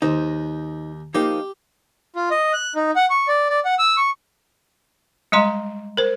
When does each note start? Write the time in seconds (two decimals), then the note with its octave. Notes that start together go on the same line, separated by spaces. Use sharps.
0.02 D#2 D#4 C5
1.15 F3 A#3 D#4 G4
2.16 F4
2.31 D#5
2.53 F#6
2.76 D#4
2.96 F#5
3.10 C#6
3.28 D5
3.49 D5
3.65 F#5
3.79 E6
3.97 C#6
5.32 G3 G#3 D#5 A#5 C6
5.97 A#4 C5